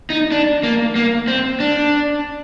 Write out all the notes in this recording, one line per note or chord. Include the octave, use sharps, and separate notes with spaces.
D#4
D4
A#3
A#3
C4
D4